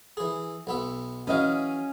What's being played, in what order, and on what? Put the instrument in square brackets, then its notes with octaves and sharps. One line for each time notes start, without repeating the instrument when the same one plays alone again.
[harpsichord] E3 G#4
B1 B3 E5
[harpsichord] E3 F#3 [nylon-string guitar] C#4 D#5 F5